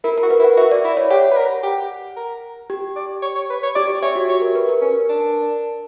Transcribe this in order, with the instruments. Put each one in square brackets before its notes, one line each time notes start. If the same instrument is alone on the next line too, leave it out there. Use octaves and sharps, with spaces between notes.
[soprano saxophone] E4 [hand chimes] A#4
[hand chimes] A#4
[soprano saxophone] F#4
[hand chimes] B4
[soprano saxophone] E4
[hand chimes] F#5
[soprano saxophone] F#4 [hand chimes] E5
[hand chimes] D5
[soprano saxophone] E4 [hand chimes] D5
[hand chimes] C#5
[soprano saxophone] G4 [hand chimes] F#5
[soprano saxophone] B4
A#4
G4
A#4
[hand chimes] G4
[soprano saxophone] D5
C#5
C#5
B4
C#5
[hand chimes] G4 [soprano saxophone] D5
[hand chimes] G4
[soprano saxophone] C#5 [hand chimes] E5
[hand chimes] F#4
[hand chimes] G4 [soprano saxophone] C#5
[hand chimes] A#4
B4
A#4
[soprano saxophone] C#4
D4